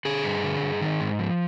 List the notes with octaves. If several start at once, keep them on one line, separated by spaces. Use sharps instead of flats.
D3 G#4
G2
D3
G2
D#3
G#2
F3